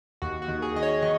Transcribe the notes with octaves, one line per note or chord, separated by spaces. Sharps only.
D#2 F#4
F#4
D#3
G#4
D#3 D#5
C#5
D#3 D#5